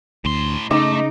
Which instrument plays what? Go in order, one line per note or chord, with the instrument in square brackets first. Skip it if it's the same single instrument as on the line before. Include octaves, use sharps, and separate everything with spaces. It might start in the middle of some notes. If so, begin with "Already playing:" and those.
[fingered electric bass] D2 [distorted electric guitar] A2 C6
[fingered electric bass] C#3 [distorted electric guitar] A3 [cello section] D#4 [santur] D6